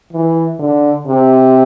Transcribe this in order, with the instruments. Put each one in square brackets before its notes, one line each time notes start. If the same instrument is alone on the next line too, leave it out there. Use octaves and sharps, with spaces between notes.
[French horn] E3
D3
C3